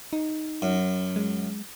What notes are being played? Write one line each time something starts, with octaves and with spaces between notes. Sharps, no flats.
D#4
F#2
G#3